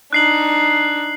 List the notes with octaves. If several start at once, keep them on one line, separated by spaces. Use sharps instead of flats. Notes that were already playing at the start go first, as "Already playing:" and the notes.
D4 D#4 F#6 C7 F#7